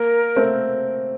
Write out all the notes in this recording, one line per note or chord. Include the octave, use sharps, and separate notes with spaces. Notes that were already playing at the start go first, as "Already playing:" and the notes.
Already playing: A#3 A#4
A3 C4